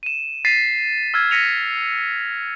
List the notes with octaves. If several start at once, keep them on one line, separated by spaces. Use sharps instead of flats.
D#7 E7
A6 B6 C7 D#7
E6 F6 G#6
A#6 B6 C#7 D#7 F7